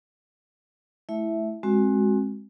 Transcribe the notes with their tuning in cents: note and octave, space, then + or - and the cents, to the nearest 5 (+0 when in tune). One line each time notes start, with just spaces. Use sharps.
A3 -20 E4 +0 E5 +0
G#3 +0 C4 +30 F#4 +0